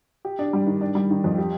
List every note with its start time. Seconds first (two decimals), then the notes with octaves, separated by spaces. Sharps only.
0.25 G4
0.39 D4
0.53 G3
0.67 D#3
0.81 D4
0.95 G3
1.10 D#3
1.24 F2
1.38 G4